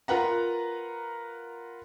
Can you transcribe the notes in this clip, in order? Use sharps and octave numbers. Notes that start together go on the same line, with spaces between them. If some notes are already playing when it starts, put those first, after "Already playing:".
F4 A#4 B4 F#5 A#5